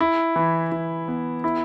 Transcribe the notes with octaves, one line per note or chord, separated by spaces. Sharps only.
E4
E3
E3
B3
E4